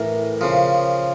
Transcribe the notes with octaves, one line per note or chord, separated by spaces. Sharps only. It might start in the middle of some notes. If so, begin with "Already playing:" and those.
Already playing: A2 E3 A#4
C#3 F3